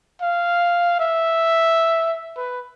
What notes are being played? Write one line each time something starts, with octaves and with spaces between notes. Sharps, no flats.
F5
E5
B4